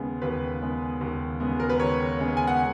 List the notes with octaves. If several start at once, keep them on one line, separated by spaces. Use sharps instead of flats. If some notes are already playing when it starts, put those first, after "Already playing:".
Already playing: D#2 C#3 G#3 B3
D#2 B4
C#3 G#3 B3
D#2
C#3 G#3 B3
A#4
B4
D#2 C#5
C#3 G#3 B3
G#5
F#5